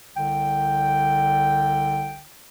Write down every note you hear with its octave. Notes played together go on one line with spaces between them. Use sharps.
C2 D3 G5